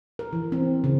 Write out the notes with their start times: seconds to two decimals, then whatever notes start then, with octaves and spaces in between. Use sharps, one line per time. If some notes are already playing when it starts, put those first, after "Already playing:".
0.19 A#4
0.33 E3
0.52 C4
0.84 C#3